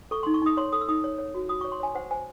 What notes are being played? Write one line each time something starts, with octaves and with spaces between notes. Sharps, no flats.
A4 C#6
D#4 C6
C#6
D#4 D#6
C#5 C6
A4 D#6
E6
D#4 D#6
C#5
C#5
F#4
F#4 D#6
C#5 C#6
C6
C#5 G#5
C5 F#5
C5 G#5